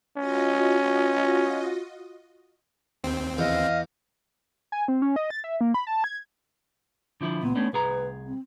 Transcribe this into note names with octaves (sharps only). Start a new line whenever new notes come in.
C#4 F4 F#4 D#5
D#2 C4
E2 D#5 F5
G#5
C4
C#4
D#5
A6
E5
A#3
B5
A5
G#6
D3 F3 E4
C#2 A#2 B3
A3 C#4 D4
C2 G#4 B4 A#5
C4